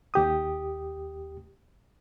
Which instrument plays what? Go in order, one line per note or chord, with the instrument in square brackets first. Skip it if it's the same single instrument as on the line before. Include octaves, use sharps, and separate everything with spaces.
[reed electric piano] D#2 G4 D#6